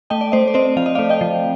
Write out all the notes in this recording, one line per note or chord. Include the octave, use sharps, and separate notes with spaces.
A3 D#5 G5
D5
A3 C5 D#5
D5
C4 C5 D#5
F3 F5
D#5
D5 F5
A3
D#5 G5
F3